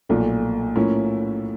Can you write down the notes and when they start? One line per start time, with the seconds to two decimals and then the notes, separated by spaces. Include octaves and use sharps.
0.09 B1 A#2 F3 A3
0.76 A2 F3 A#3 C#4 E4